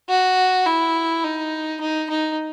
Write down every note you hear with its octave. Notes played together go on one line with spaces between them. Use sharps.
F#4
E4
D#4
D#4
D#4